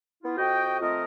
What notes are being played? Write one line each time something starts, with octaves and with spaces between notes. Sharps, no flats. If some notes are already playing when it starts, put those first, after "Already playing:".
B3 E4 F4
F2 F#4 D#5 G5
F3 A3 C4 F4 A#4 D#5